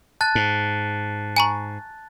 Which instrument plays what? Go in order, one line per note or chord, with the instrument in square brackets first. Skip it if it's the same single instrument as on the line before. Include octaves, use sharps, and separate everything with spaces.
[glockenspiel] A5 F#6 A6
[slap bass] G#2
[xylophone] G#5 A#5 C#6